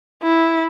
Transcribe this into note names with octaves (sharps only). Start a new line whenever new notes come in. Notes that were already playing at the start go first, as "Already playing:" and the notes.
E4